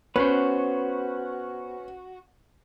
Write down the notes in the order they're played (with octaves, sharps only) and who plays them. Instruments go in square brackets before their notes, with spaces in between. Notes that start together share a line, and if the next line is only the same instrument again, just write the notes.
[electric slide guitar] B3 C5 [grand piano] C#4 [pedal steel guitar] F#4 [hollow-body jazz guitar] B4